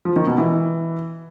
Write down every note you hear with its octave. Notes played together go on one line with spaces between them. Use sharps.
F3
D#3
B2
E3